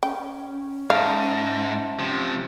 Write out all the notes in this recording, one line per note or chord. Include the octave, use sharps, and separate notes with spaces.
C#4 G5
G#2 E5 F5 A5
C3 F3